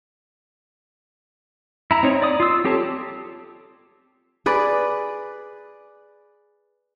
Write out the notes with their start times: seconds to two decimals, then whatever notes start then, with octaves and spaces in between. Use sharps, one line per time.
1.91 E4 A#5
2.03 C4 D#4 C#5
2.22 D5 D#6
2.40 F4 E6
2.65 C4 G4 A4 C#5 A5
4.46 G#4 B4 D5